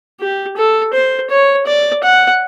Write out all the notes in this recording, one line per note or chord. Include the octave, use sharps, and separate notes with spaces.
G4
A4
C5
C#5
D5
F#5